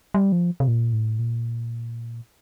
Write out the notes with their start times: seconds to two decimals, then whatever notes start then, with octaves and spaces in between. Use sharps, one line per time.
0.14 G3
0.32 F3
0.60 C3
0.68 A#2
0.93 A2
1.19 A#2